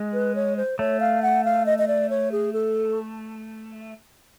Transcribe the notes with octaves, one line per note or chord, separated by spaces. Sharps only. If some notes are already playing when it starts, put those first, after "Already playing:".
Already playing: G#3
B4
C#5
C5
A3 C#5
F5
F#5
F5
D#5
D#5
D5
C#5
G#4
A4